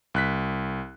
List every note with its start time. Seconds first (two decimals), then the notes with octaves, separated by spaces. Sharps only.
0.14 C2 F#6 B6